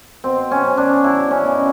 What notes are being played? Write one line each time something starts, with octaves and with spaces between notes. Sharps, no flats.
B2 C4
C#4
F#3
D4
F#3 E4
C#4
B2